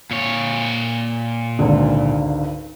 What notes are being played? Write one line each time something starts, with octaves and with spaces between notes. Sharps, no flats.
A#2 C#5
G#1 C#2 D3